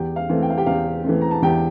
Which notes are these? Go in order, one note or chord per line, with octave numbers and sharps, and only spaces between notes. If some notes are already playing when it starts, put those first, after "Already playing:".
Already playing: E2 G4 G5
F5
E3 A3 C4
G5
F5
G4 G5
E2 F5
E3 A3 C4
A#5
A5
E2 G4 G5